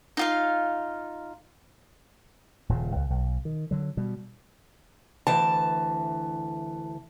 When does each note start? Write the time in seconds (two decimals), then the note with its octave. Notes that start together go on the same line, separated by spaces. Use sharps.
0.17 D#4 F4 F5
2.69 D#1 A#2 C#3
2.95 C#2
3.10 B1
3.45 D#3
3.71 D3 F#3
3.97 B2 G3
5.27 D2 E3 A5